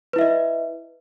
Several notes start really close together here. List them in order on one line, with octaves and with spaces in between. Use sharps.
B4 E4 E5 D#5